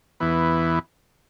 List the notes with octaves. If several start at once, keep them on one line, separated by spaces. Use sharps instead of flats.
E2 E3 B3